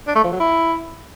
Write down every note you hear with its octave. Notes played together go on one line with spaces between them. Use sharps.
D4
A3
F3
F#3
E4